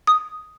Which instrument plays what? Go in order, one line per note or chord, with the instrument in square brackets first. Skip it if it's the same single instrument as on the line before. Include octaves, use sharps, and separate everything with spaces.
[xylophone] D#6